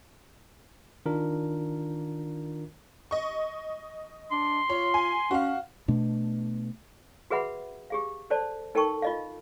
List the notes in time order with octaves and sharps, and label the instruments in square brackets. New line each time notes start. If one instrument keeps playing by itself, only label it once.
[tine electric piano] D#3 D4 F4 A#4
[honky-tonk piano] D#5 C#6
[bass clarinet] D4 [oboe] C6
[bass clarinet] F4 [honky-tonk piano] C#5
[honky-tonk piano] G#5
[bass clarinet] C#4 [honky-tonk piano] F#4 F5
[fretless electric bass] B2 A3 D4
[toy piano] F#4 G#4 B4 E5 F#5 B5
G4 G#4 F5
A4 C5 D5 A5
D#4 A4 A#4 G5 A5 C#6
F4 D#5 F5